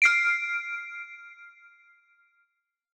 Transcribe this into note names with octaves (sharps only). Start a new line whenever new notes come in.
F6 C7 D7